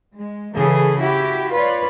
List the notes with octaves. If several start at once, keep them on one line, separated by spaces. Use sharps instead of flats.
G#3
C#3 E3 G#4 A4
E4 F#4 G4
F4 B4 C#5 D5